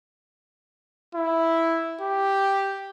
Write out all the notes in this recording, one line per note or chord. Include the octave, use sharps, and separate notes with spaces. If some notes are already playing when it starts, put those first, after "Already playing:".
E4
G4